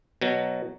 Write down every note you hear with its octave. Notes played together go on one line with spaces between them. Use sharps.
B2 F#3